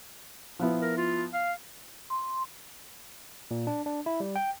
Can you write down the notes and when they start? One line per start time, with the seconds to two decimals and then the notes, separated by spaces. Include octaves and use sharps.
0.59 F3 B3 E4
0.82 A#4
0.97 F4
1.33 F5
2.10 C6
3.51 A#2
3.67 D4
3.86 D4
4.06 E4
4.20 G3
4.36 G5